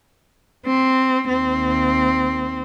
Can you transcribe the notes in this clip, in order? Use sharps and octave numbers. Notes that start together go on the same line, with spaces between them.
C4
D#2 C4